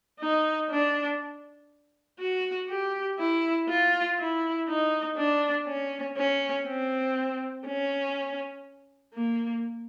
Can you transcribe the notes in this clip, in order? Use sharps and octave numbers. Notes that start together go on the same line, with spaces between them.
D#4
D4
F#4
G4
E4
F4
E4
D#4
D4
C#4
C#4
C4
C#4
A#3